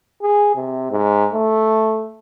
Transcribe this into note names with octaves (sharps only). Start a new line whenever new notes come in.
G#4
C3
G#2
A3